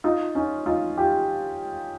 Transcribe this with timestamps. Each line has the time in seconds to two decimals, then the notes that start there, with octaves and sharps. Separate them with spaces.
0.04 D#4 F4
0.35 C#4 D#4
0.66 D#4 F4
0.97 F4 G4